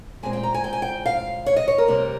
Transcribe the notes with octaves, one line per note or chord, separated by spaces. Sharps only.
A#2 G#3 C4 G#5
G5
A#5
G#5
G5
G#5
G5
F5
C#5
D#5
C#5
A#4
C3 G3 A#3